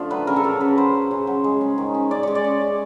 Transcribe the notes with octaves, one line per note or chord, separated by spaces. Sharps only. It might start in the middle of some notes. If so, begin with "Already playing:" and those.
Already playing: D3 F3 A3 D4
F#3 B4
C#3 A#4
A4
C#3 A#4
C#3 B4
F#3 C5
F#3
C#3
F#3
G#3
C#4
D#3
C#4
C#4 D5
G#3 C#5
D5
C#4
G#3